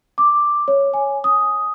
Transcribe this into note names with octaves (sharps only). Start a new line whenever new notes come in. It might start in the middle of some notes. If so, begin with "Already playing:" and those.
D6
C#5
G#5
D#6